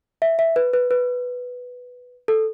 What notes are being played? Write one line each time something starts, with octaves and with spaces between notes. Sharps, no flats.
E5
E5
B4
B4
B4
A4